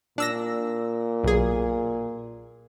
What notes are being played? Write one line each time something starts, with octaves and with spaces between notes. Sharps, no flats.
A#2 D4 E6 A#6
B1 G#4